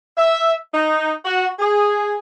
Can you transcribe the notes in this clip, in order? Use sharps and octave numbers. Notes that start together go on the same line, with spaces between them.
E5
D#4
F#4
G#4